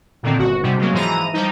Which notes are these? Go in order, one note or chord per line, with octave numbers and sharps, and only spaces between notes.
A#2 D3 D#3 C4
G1 F#4
G#2 C3 G3
C#3 F#3 G#3 A#3
G#2 E3 F3 A#5 D#7
F3 G3 D#4